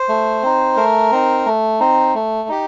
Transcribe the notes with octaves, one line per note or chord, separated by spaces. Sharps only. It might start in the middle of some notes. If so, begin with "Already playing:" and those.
Already playing: C5
A3
C4 D#4
A3 A#4
C4 D#4
A3
C4 D#4
A3
D#4 G4